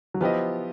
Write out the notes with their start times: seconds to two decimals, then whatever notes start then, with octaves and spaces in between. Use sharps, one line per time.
0.14 F#3
0.21 F3 B3 E4 G4 C5 D#5